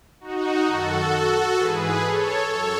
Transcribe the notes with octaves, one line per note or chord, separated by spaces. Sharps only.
D#4 F#4
F#2 D#3 F#4 A4
G#2 E3 G#4 B4
A4 C#5
F#2 A4 C#5